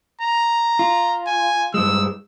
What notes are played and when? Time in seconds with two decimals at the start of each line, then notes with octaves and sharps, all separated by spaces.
0.21 A#5
0.79 F4
1.27 G#5
1.74 G2 G#3 E6